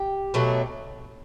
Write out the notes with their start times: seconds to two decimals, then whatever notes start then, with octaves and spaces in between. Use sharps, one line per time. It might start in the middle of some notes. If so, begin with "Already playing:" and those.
Already playing: G4
0.34 B2 F#3 A3